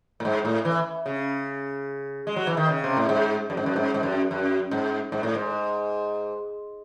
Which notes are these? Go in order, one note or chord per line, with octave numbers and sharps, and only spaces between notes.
A2
G#2
A2
E3
C#3
G#3
F#3
E3
D#3
C#3
C3
A2
G#2
F#2
G#2
F#2
G#2
G#2
F#2
F#2
G#2
G#2
A2
G#2